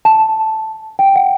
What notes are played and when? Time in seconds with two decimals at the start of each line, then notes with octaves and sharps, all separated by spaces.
0.05 A5
0.99 G5
1.16 F#5